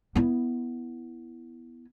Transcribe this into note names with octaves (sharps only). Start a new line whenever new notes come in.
B3 E4